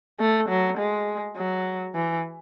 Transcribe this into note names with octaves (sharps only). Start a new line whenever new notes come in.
A3
F#3
G#3
F#3
E3